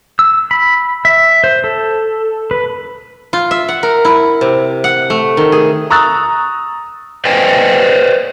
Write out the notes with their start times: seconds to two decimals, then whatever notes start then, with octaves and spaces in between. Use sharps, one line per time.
0.19 E6
0.51 B5
1.05 E5
1.44 C5
1.64 A4
2.51 B4
3.33 F4
3.51 E5
3.69 F#5
3.83 A#4
4.05 E4
4.41 C3
4.84 F#5
5.10 A3
5.37 D#3
5.52 G#4
5.90 A#5 C#6 D#6 E6 F#6 A6
7.25 B4 C5 D5 D#5 G5 G#5